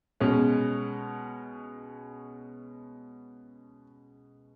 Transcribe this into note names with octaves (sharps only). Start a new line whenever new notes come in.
B2 G#3 C#4